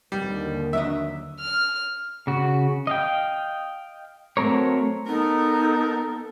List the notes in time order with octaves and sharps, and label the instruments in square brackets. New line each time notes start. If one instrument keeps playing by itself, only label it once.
[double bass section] D#2 D3 D#3 [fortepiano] G3
[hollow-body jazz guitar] F#3 D4 D#5 [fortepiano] E5
[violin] F6
[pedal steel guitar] C#3 F#4
D#5 F5 G5
F#3 A3 C4 A#4 C#5
[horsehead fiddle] B3 A4 [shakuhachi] D#4 [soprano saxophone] A#4